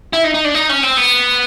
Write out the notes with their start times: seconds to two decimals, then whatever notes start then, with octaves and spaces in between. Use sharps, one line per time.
0.13 E4
0.24 D#4
0.34 D#4
0.45 D4
0.54 D#4
0.69 C#4
0.83 C4
0.97 B3